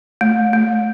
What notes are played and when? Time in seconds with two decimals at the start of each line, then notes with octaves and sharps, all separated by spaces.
0.21 A3
0.53 A3